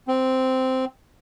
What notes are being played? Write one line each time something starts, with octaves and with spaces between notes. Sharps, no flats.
C4